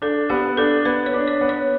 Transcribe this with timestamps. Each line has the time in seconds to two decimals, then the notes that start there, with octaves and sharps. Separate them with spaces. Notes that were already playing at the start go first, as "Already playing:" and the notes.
0.02 D4 A4
0.30 B3 G4
0.57 D4 A4
0.85 B3 B4
1.06 C#5
1.14 D4
1.28 C#5
1.41 B3
1.49 C#5